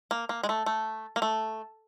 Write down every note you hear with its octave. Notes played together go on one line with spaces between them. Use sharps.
A#3
A#3
G#3
A3
A3
A#3
A3